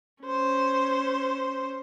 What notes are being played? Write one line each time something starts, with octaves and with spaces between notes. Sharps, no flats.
C#4 C5